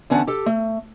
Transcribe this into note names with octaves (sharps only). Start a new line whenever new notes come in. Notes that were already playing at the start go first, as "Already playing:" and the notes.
E2 D3 C#4 F#5 G#5 A5
G4 A4
A3